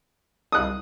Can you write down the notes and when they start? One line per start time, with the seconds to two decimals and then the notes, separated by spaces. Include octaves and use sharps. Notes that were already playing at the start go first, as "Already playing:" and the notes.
0.52 C2 D#6 F#6